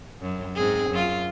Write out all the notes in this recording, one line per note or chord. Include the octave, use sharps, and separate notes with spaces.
F#2
G#2 C4 G#4
F#2 F4